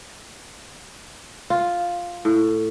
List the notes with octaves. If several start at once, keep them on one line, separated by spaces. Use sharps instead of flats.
F4
A2